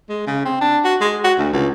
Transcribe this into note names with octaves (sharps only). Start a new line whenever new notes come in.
G#3
C#3
C4
D4
F#4
G#3
F#4
D2
C#2